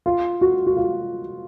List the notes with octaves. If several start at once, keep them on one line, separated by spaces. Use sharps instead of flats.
F4
F#4
F#4
F4